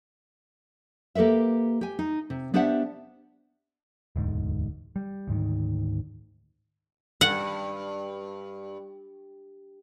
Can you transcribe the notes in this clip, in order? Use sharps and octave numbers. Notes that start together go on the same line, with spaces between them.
A#3 G4 A4 B4 E5
G4 G#5
D#4
C3
B3 D4 G4 C5 E5 F#5
E1 D2 G#2
G3
D2 G#2 D#3
G2 F#5